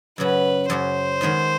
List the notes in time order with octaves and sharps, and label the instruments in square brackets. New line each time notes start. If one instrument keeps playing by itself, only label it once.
[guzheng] F#2 C#3 F#3 [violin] B4
[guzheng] F#2 C#3 F#3 [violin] C5
[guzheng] D#3 G#3 B3 D#4